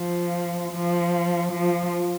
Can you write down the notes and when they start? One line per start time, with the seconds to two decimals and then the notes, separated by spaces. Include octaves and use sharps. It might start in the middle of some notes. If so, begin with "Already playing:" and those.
Already playing: F3
0.72 F3
1.52 F3